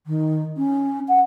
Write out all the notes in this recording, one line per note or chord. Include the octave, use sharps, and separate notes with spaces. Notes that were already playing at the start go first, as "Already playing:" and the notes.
D#3
C#4
F#5